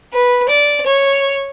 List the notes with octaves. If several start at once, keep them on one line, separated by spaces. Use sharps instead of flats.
B4
D5
C#5